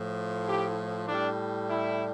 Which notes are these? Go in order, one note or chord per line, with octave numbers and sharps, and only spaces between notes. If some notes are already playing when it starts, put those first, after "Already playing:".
Already playing: A2 F3
G4
A2 G3 D4
E4